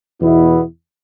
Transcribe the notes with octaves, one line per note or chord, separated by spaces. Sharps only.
E2 B2 B3 E4